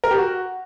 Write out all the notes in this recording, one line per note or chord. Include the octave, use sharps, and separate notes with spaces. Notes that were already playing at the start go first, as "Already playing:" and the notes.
A#4
G4
F#4